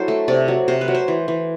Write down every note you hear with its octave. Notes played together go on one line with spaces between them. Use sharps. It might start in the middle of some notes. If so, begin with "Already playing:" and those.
Already playing: F#3 D4 E4 A4 C5
A3
C3 D5
F#3
C3 C5
B4
F#3
C5
E3
E3